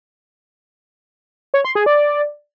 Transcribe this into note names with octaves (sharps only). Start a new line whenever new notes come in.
C#5
C6
G#4
D5